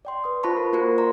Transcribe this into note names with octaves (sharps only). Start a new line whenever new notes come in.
D5 G5 C6
B4 D#6
F4 C5 A5 B5 C#6
A#4
A#3 F4 F#4 A#4 C5
D5 A#5 C6